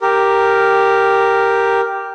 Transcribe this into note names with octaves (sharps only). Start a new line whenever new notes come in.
G4 A#4